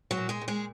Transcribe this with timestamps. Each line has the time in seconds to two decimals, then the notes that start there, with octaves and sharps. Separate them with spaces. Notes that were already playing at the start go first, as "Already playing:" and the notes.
0.11 F#3 F#4
0.17 A#2
0.29 G#3 G#4
0.41 A#2
0.48 G#3 G#4